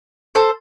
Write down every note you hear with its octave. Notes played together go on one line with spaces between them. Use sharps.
A4 C5